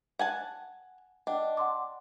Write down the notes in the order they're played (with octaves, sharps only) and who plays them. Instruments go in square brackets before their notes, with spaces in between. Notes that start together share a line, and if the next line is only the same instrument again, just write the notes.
[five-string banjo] F#5 G#5 A5
[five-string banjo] D4 [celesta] D#5 F#5 G5
[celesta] F#5 C6 D6